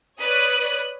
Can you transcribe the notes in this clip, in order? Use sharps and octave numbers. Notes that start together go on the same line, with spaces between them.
B4 C#5 D5 D#6 F#6